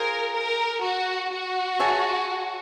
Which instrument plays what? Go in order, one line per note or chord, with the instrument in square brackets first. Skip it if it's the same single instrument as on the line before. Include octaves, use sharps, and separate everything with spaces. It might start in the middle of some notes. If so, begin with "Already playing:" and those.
Already playing: [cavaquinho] F4 G#4 C5 F5 [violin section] A#4
[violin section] A#4
F#4
F#4
[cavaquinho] G#4 C#5 E5 A5